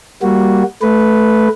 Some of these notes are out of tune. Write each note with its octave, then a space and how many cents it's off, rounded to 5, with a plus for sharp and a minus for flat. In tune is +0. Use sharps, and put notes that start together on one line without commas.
G3 +0 A#3 +0 F#4 -5
A3 -15 B4 +0